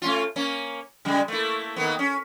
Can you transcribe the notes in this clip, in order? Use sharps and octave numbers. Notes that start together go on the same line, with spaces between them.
A3 C#4 F4
A#3 C#4
C#3 G3 G#3
A3 A#3 E4
D#3 A#3 B3
C#4